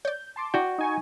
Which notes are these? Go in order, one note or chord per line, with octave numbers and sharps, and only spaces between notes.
C#5 D5 G6
A5 C6 D6
D4 E4 F#4 D5 G5
D#4 G#5 C#6